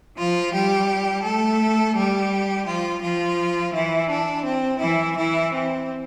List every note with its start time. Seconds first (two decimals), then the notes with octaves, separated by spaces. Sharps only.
0.17 F3 F4
0.53 G3 G4
1.24 A3 A4
1.95 G3 G4
2.66 F3 F4
3.02 F3 F4
3.73 E3 E4
4.09 D4
4.45 C4
4.79 E3 E4
5.16 E3 E4
5.52 C4